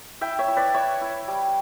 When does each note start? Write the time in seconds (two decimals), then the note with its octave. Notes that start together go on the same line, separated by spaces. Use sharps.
0.21 E4 E5 G5
0.39 C#5 E5
0.48 E4
0.57 B4 D5
0.74 E4 C#5 E5
1.01 E4
1.28 G3